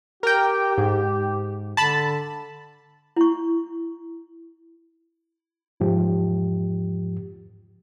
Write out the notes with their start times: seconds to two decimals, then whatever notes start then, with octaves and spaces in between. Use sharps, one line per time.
0.23 G4 A#4 G5
0.78 G#2
1.77 D3 A5 B5
3.16 E4 C#6
5.80 E2 G#2 F3 G4